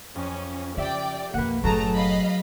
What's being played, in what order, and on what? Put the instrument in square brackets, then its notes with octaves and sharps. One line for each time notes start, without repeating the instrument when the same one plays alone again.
[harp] F2 [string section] C#4
[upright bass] C#3 [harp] G4 E5 [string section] D5 G5
[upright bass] B1 F2 [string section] A#3 [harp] B4 F#5
[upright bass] F#1 A2 [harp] F#3 G#4 [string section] A3 A5 A#5
[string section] D#5 F5 B5